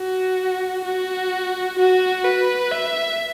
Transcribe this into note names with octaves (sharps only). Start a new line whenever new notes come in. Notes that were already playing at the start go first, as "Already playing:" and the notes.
Already playing: F#4
F#4
F#4
B4
E5